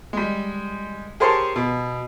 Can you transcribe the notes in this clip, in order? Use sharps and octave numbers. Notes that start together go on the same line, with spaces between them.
G3 G#3
G4 G#4 A#4 C5 C#5 A5
B2